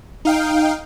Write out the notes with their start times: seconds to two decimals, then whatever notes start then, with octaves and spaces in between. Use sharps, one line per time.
0.25 D#4 F5 G5